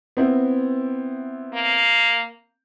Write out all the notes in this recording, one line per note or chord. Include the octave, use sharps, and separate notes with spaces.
B3 C4 E4
A#3